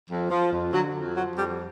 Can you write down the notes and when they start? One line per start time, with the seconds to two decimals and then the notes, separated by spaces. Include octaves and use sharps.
0.10 F2
0.30 F3
0.52 F2
0.73 D3 F#3
0.94 F2
1.15 F3 F#3
1.37 F2 G3